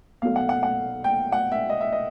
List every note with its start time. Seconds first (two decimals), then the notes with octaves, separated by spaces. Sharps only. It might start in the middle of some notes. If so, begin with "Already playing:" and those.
0.22 B1 B2 F#3 A3 F5
0.36 F#5
0.49 F#5
0.63 F#5
1.04 G5
1.32 F#5
1.52 E5
1.69 D#5
1.81 E5
1.92 D#5